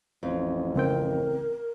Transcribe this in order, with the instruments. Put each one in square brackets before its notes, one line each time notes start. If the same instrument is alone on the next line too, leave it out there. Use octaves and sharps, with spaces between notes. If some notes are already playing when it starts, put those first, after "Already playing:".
[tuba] A1 [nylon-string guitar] F2
[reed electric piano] C#2 C4 G5 [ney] A#4